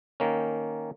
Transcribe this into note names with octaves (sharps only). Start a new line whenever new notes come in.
D#3 A#3 C#4